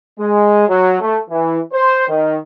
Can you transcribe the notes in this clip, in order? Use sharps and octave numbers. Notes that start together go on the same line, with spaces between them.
G#3
F#3
A3
E3
C5
D#3